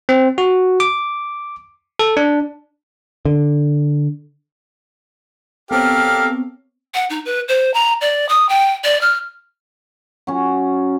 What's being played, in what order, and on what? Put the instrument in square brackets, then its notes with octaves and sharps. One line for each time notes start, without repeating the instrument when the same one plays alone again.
[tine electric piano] C4
F#4
D6
A4
D4
[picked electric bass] D3
[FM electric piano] B3 C4 C#5 [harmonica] G4 [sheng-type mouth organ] A4 A#4 [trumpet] F5
[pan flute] F#5
D#4
B4
C5
A#5
D5
D#6
G5
D5
F6
[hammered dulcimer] F#3 C#4